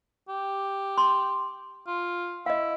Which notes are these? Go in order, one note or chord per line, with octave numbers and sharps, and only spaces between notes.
G4
C6
F4
E4 D#5 F5